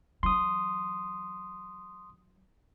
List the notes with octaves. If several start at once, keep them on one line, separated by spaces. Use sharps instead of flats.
E3 F#3 C6 D#6